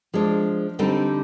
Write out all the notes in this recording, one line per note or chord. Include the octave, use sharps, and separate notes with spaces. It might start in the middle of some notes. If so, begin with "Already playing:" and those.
F3 G#3 D4
D3 G3 C4 D#4